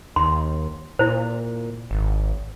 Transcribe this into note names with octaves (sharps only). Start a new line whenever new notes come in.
D#2 C6
A#2 E4 C5
G#1